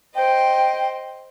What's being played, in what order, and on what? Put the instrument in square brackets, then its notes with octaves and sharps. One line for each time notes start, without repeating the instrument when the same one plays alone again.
[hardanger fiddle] C5 D#5 [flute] G5